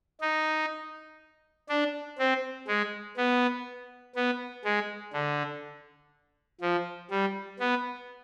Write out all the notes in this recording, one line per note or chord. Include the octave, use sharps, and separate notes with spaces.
D#4
D4
C4
G#3
B3
B3
G#3
D3
F3
G3
B3